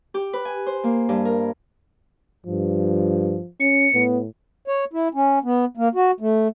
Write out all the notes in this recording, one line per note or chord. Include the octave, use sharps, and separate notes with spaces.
G4
B4
G#5
C5
A#3
G2
A#4
G2 F3
C#4 C#7
A2 B3
C#5
E4
C#4
B3
A#3
F#4
A3